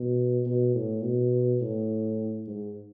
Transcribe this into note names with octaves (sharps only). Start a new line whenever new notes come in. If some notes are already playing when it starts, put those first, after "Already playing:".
Already playing: B2
B2
A2
B2
A2
G#2